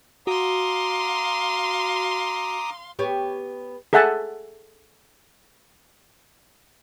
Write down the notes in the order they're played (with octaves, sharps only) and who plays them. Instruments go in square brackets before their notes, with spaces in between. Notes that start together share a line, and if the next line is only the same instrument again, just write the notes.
[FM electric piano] F#4 [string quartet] F5 C6 [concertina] A#5 D6 D#6
[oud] B3 G4 C#5
[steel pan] G#4 A4 E5 F#5 G#5 A5